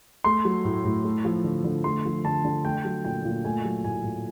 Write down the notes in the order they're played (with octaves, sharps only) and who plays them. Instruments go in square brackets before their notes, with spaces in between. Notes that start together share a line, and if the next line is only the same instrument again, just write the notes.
[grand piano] A3 C6
F#3
A2
A2
A3
F3
D3
D3
A3 C6
F3
D3 A5
D3
A3 G5
F#3
A#2 G5
A#2
A3 G#5
F#3
A2 G#5
A2